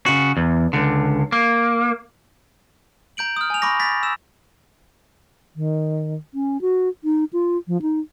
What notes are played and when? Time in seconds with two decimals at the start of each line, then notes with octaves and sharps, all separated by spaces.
0.06 C#3 F#4
0.37 E2
0.73 C#2 D3
1.32 A#3
3.17 A#5 G6 D7 F#7
3.37 D#6 F6
3.50 G#5 F7
3.62 B5 C#6 D6 A#6
3.80 A6 B6
4.03 E6 E7
5.56 D#3
6.34 C#4
6.61 F#4
7.04 D#4
7.33 F4
7.68 F3
7.82 D#4